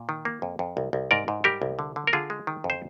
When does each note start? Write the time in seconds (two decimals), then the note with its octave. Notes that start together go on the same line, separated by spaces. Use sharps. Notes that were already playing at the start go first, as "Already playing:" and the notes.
Already playing: A#2
0.09 D#3
0.25 A#3
0.42 F2
0.59 F2
0.77 C2
0.93 C2
1.11 G#2 A#4 D5
1.28 G#2
1.44 G3 G4 A#4
1.62 C2
1.79 D3
1.96 D3
2.07 A#4
2.13 D3 F4 G#4
2.30 G#3
2.47 D#3
2.64 F2
2.70 C5